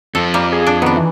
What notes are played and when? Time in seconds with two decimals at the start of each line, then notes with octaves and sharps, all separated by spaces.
0.15 F2 F3 A4
0.34 G3 A#3
0.52 G#4
0.67 D4
0.82 D#3 B3 D4
0.97 E3